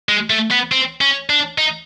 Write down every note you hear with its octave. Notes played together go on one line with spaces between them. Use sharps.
G#3
A3
B3
C4
C#4
D4
D#4